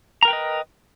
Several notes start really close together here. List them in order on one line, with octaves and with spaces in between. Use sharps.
A#5 A#4 G5 B4 D#5